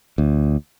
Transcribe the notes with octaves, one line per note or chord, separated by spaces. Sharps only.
D2